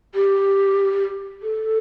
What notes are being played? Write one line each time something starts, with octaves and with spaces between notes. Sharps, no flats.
G4
A4